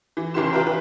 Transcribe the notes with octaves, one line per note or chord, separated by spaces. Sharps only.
E3
F1 C#3 E3 G4 C6 E7
F4 G4 B4 E5 G5 A#5
E3 B4